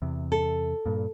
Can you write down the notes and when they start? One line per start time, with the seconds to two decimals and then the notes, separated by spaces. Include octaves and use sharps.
0.02 E2 C3
0.32 A4
0.86 G2 A#2